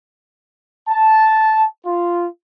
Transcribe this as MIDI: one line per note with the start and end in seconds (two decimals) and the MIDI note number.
0.88 1.65 81
1.85 2.26 65